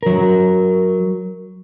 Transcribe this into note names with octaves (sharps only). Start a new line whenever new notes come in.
F#3 A#4